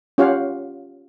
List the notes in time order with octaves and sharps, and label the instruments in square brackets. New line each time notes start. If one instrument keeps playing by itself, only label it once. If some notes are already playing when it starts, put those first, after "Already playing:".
[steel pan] C#4 F4 G4 C#5 F5 F#5